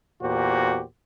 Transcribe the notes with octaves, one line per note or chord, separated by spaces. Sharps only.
E2 A#2 F#4 G4 C5